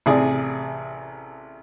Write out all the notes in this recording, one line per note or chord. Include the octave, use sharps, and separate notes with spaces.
A1 C3 G#4 D5 G#5